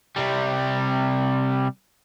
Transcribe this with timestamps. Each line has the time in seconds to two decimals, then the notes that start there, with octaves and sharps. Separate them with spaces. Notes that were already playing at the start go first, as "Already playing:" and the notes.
0.16 C3 G3